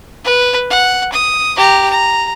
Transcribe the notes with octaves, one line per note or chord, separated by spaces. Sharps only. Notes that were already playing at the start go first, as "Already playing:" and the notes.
B4
F#5
D#6
G4 A#5
A#5